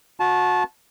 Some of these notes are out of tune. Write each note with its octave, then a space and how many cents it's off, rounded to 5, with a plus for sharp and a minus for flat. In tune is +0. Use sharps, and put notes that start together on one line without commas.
F#4 -30 A5 -20